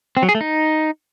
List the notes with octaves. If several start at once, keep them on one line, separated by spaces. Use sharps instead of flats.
C4
F#3
G#4
A3
D#4